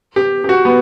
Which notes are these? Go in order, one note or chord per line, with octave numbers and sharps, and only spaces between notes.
G4
G4
F#4
B3